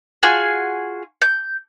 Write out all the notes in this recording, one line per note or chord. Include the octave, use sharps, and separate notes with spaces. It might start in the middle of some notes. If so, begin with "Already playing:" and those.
F4 F#4 G#4 G#5
G6